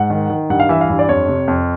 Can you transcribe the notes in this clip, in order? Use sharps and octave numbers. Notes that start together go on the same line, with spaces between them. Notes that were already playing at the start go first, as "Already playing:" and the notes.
Already playing: G#2 F#5
D#3
D#3
G2 F#5
F5
E3 E5
F5
G2
D5
F2 C#5
C3
F2